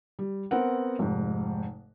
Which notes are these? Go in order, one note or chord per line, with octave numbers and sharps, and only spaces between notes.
G3
B3 C4 A#4 F#5
F1 G#2